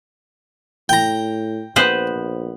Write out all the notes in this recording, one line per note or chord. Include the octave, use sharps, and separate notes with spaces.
A2 G5 A#5
A#1 B3 B4 C5